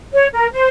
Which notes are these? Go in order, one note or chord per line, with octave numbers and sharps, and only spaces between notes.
C#5
A#4
C5